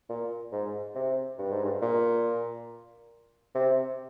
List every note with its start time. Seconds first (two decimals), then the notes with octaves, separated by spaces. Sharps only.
0.09 A#2
0.52 G#2
0.95 C3
1.39 G2
1.51 G#2
1.64 G2
1.82 A#2
3.55 C3